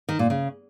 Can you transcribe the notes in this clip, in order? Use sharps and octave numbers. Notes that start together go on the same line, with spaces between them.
D#3
A#2
C#3